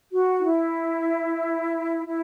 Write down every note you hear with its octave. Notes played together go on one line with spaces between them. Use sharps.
F#4
D#4
E4
E4